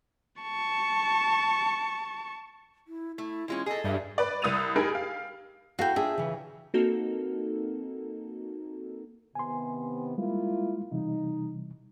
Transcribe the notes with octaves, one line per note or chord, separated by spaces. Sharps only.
A5 C#6
E4
A3 E4
E3 G#3 C#4 F4
G#4 A4 D#5
G2 E5
B4 D5
C2 D#6 E6 A6 D#7 F7
D#4 G4 G#4 A#4 G#5 B5
G4 F5
E4 F#4 A4 F5 G5
D4 F4 G#4 E5
C#3 E3
A#3 C4 D#4 F#4 A4 A#4
C3 D#3 B3 G#5 C6
G3 G#3 A#3 E4 F4
C3 E3 G3 D#4